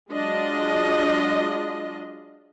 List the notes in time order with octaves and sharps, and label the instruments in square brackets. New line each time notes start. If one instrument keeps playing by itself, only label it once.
[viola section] F#3 G#3 D4 F4 D#5